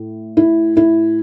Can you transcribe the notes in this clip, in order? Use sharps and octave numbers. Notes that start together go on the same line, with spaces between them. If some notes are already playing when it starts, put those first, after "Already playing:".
Already playing: A2
E4
E4